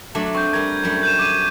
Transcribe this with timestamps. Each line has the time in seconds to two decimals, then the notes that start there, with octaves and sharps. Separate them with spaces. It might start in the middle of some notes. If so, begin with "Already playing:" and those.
0.15 F#3 A3 D4
0.35 C4 C#6 G6
0.53 G3 A#4 G#6
0.84 F#2 G3 A3
1.03 G6 D#7 E7
1.19 D6 D#7